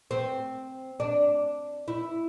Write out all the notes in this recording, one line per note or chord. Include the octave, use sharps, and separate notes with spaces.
C4
D4
E4